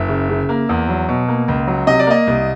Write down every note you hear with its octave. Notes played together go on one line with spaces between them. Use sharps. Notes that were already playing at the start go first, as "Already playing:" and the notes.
Already playing: F#1 E5
C#3
C#3
A#3
E2
F#3
B2
A#3
C#2
F#3
C3 D#5
D5
A#3 D#5
C2